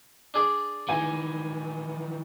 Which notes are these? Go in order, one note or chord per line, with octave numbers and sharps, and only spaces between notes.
D4 G#4 D5
D#3 E3 G#5